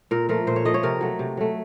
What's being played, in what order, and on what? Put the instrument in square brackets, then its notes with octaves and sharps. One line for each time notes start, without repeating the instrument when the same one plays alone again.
[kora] A#2 A#4
F3 A3 A#4
A#2 C5
C#5
F3 A3 D#5
C#5
C3 A#4
F#3 A3
C3
F#3 A3